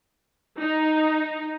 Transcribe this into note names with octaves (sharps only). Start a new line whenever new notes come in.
D#4